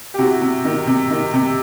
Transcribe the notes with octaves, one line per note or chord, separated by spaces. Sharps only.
G4
C3 E4 F#4
C3
D#3
C3
D#3
C3